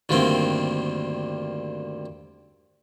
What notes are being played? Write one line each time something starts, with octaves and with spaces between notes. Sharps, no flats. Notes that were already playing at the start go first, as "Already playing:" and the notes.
D2 G2 D3 D#3 A#3 C4